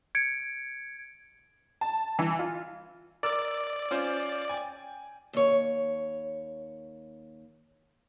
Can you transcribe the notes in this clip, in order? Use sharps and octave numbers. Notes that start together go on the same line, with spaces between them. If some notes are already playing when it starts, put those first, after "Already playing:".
G#6 C#7 D7
A5
E3
F4
A#4 D5 D6 E6
C#4 F4 C5
G5 G#5
D#2 C#5